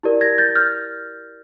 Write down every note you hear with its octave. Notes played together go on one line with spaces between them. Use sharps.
E4 G4 A#4 D5
G#6 A#6
G6 A6
F6 G6